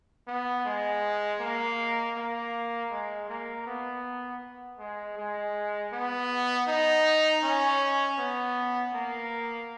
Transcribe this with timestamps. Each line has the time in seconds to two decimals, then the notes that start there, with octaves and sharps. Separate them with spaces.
0.27 B3
0.65 G#3
1.40 A#3
2.16 A#3
2.91 G#3
3.28 A#3
3.66 B3
4.79 G#3
5.17 G#3
5.92 B3
6.67 D#4
7.43 C#4
8.18 B3
8.93 A#3